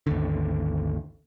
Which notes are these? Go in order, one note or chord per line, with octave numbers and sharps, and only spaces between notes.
G#1 D#2 D3